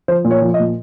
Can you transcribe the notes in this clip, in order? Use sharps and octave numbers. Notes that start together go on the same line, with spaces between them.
F3 C5
A#2
C#5
F3
D#5
A#2